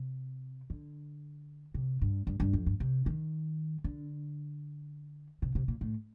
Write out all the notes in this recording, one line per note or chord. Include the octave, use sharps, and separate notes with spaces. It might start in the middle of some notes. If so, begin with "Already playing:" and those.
Already playing: C3
D3
C3
G2
G2
G2
F2
G2
C3
D#3
D3
C3
C3
A#2
A2